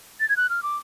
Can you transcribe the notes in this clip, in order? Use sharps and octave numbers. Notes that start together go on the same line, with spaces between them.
A6
G#6
F#6
F6
D6